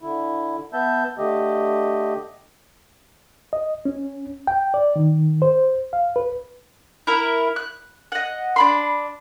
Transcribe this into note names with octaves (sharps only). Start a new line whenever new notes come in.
D3 E4
B3 E5 A5 G6
D3 A3 G4 D#5
D#5
C#4
G5
D5
D#3
C5
F5
B4
E4 A#4 E5
F#6
D#5 F#5
D4 B5 C6